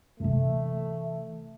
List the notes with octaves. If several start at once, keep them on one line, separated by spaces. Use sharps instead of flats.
C3 E3 A3